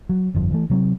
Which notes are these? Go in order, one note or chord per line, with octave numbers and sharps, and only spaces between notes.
F#3
G1 F2 F3
E3 A3
C3 F#3 C4